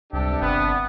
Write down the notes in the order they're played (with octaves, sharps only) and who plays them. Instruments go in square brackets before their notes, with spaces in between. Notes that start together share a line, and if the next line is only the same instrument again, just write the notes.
[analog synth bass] C#2 [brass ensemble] G2 C3 D4 [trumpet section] G4 A4
[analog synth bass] G1 [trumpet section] B3